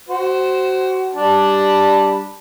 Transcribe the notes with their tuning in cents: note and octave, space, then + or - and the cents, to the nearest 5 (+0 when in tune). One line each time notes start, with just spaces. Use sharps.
F#4 +25 C5 +0
G3 +0 D4 +0 A5 +0